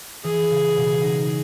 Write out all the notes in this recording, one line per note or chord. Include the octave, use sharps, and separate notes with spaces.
E3 G#4
C#3
B2
D#4